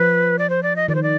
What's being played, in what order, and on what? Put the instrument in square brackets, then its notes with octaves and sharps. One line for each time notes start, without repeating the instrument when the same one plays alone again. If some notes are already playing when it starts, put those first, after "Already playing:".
Already playing: [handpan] F3 [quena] B4
[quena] D5
C5
D5
D#5
[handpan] D#3 [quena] D5
[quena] C5
D5